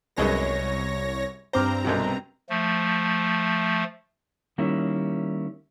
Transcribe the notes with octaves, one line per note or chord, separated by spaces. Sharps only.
C2 F#2 G#3 B3 C#5 A#6
G2 C4 C5 A#5 D6 F6
B1 F#2 C3
F3 A3
D#3 G3 A#3 C#4 E4